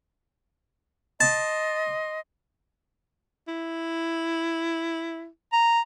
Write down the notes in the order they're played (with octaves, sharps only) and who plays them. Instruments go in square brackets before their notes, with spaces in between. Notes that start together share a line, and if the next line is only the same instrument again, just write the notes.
[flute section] D#5 C6 [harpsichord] A5
[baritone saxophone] E4
[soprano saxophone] A#5